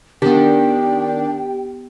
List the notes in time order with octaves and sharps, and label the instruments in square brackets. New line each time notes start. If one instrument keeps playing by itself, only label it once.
[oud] D#3 [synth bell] B3 G4 [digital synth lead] D4 [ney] G5